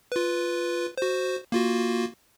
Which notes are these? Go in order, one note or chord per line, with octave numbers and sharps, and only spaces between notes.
F4 B4
F#4 C5
A#3 F4 F#4